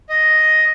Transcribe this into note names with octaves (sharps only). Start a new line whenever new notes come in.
D#5